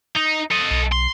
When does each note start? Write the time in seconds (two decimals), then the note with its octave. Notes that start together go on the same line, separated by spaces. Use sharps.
0.15 D#4
0.51 A4 D#5
0.71 B1
0.92 C6